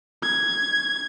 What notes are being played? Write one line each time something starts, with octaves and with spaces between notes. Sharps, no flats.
G#6